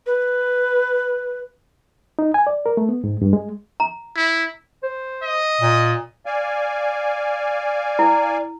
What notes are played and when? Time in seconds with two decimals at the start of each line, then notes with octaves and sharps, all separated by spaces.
0.06 B4
2.19 D#4
2.34 G#5
2.47 D5
2.66 A#4
2.77 A3
2.89 B3
3.04 G#2
3.22 G2
3.33 G#3
3.80 A#5
4.16 E4
4.83 C5
5.23 D#5
5.61 A#2
6.26 D5 F5 G#5
7.99 E4